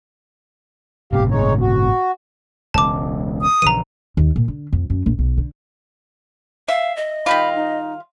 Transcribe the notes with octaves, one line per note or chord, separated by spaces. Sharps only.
G1 A2 C3 G4 F5
G#3 D#4 C#5
F#4
E1 C#2 A5 D6
D#6
A#1 C#3 E3 A#5 D#7
D#2
A#2
D3
F2
F#2
A#1
B1
D3
E5 F5
D#5
D#3 G3 F4 B5
D#4